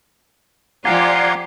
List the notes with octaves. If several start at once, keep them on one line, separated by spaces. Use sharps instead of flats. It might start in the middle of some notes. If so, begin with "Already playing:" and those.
F3 G4 D5 F5 F#5 G#5 A#5 C6